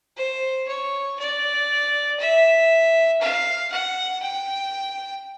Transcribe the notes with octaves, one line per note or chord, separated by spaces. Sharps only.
C5
C#5
D5
E5
F5
F#5
G5